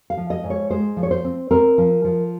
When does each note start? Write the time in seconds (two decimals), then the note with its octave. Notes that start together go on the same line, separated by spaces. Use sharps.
0.10 F5
0.17 F3
0.30 D#5
0.44 G#2
0.50 C#5
0.70 G#3 C5
0.97 F3
1.03 C#5
1.11 C5
1.24 C4
1.51 C4 A#4
1.78 F3
2.04 F3